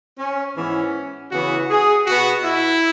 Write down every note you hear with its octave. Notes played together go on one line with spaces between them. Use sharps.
C#4
G#2 E3 B3 C#4
C#3 E3 B3 F#4
G#4
B2 B3 F#4
E4